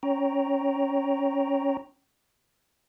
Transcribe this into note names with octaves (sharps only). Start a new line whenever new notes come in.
C#4 C#5 G5 A#5